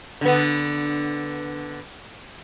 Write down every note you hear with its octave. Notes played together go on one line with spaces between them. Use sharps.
D3 B3